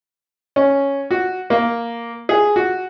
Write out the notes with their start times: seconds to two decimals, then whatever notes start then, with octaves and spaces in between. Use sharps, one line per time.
0.56 C#4
1.11 F#4
1.50 A#3
2.29 G#4
2.56 F#4